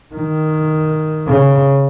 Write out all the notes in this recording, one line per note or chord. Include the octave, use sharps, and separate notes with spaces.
D#3
C#3